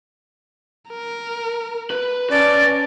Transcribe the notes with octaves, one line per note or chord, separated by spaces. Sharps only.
A#4
B4
C#4 B4 D5 A5